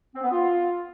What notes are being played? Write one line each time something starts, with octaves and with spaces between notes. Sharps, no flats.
C4
B3
F4